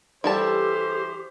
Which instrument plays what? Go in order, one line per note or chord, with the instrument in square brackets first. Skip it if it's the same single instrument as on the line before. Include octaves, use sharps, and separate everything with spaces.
[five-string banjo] E3 G3 A5 [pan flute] G4 [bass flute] A4 [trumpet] C5